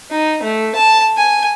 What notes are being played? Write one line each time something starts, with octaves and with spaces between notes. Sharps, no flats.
D#4
A3
A5
G#5